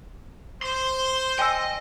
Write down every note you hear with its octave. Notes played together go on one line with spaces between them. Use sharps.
C5 C6
D#5 G5 G#5 E6